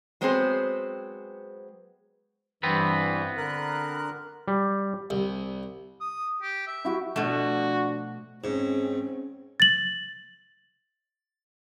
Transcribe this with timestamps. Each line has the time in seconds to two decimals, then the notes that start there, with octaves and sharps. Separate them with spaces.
0.21 F#3 G#3 B3 C4 G#4 C5
2.63 G2 E3 B3 C4 B4
3.38 D3 A#4 F#6
4.48 G3
5.10 C2
6.01 D#6
6.42 G4
6.67 E5
6.85 E4 F#4 G4
7.16 B2 F3 A3 D4 F#4
8.44 G#2 C4 C#4
9.60 A6 F#7